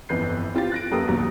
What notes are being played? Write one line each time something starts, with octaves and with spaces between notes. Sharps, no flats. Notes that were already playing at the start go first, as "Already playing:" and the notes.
G1 F2 E3 B4 G6 C7
C4 F4 G4 A6
F#6 A#6 D7
F#2 A#3 G4 A4 B4 D#6
D#2 A#2 F#3